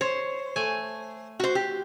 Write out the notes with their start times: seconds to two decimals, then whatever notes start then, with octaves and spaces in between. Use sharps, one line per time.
0.01 C5 C#5
0.56 A3 G#5
1.40 F#4 C5
1.55 G4